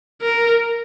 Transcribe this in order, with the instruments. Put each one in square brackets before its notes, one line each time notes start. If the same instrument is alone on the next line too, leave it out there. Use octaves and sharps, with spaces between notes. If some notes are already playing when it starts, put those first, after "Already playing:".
[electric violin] A#4